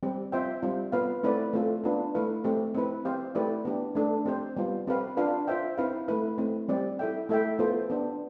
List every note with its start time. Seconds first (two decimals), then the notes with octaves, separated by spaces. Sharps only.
0.03 G3 C4 G4
0.32 C4 F4 C5 E5 G5
0.63 G3 C4 F4
0.92 B3 F4 B4 F5
1.23 A3 C4 E4 B4 D5
1.53 A3 C4 F4 A4
1.84 B3 D4 F4 B4
2.15 A3 E4 B4 F5
2.44 A3 C4 G4
2.74 C4 E4 B4
3.05 C4 G4 C5 F5
3.35 A3 E4 G4 B4 D5
3.65 B3 D4 G4
3.95 A3 D4 A4
4.26 C4 G4 C5
4.57 G3 B3 F4
4.87 C4 G4 B4 F5
5.17 D4 F4 B4 F5
5.47 F4 C5 E5 G5
5.78 C4 E4 B4 F5
6.08 A3 E4 B4
6.38 A3 C4 E4
6.68 G3 C4 G4 D5
6.99 E4 A4 E5 G5
7.29 A3 E4 A4 E5 G5
7.59 B3 F4 A4 C5
7.90 B3 D4 G4